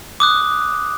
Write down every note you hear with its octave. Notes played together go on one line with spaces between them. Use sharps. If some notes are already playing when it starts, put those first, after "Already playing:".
D6 D#6 F#6